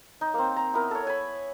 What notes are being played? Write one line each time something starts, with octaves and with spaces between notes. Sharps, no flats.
D#4
A#3 C4
A#5
B3 E4 A#4
A4 C#5
G#5 B5